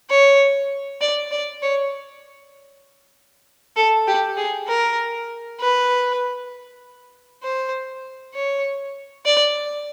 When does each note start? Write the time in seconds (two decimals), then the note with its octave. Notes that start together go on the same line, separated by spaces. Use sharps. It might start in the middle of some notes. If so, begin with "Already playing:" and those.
0.10 C#5
1.01 D5
1.32 D5
1.62 C#5
3.76 A4
4.07 G4
4.37 G#4
4.68 A#4
5.60 B4
7.43 C5
8.34 C#5
9.26 D5